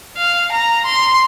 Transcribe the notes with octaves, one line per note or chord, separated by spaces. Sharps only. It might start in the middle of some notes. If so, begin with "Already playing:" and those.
F5
A#5
C6